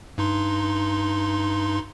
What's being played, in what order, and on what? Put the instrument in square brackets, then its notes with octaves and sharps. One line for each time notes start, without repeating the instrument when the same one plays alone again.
[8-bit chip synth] G2 D#4 C6